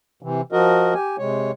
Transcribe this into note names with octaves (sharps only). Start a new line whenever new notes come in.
C3 E3
F3 F#4 A#4 D#5
G4 G#5
C3 G#3 C#5